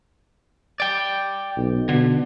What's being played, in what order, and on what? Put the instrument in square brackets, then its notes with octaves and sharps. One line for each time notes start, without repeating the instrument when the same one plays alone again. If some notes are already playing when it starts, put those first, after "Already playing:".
[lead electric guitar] D5 G5
[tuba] B1
[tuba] B2 [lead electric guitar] D3